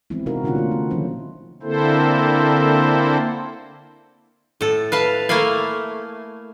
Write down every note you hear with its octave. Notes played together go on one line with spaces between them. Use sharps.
E3 G#3 B3 C4 E4
C3 D#4 F#4 A#4 F5
A#2 D3 C#4 D4 F4 F#5
A3 A#3
E4
D#3 F3 C#4 C5
D3 A#3 C4 E4 A4 C5
A2 A4
B4 F5 A5
A3 A#3 E4 F5 G#5